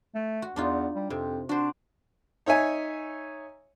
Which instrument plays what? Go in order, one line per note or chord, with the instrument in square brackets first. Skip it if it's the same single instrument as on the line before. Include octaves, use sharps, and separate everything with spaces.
[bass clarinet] A3
[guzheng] F#4
[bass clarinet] E2 [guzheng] D4 D#4 F4
[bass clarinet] G3
[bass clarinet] F2 [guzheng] C3
[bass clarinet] D4 [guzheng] F#4 C5
[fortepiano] D#4 C#5 E5 G#5